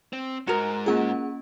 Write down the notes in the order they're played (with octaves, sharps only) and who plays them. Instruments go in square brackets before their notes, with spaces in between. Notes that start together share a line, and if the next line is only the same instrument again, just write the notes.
[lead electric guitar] C4
[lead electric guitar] G#2 [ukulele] F#4 A#4
[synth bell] A#3 C#4 F4 [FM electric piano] G#4 F#5